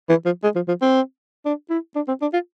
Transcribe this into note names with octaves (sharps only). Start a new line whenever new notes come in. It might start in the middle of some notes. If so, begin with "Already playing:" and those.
E3
F3
G#3
F3
F3
C4
D4
E4
D4
C4
D4
F4